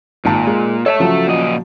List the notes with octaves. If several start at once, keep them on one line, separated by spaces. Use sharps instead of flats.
G#1 A#2 A5
G#3
A4 C#5 E5 A5
C#3 F3 F#3
A#2 D#5